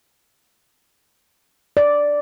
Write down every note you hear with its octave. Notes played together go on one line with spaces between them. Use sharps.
D5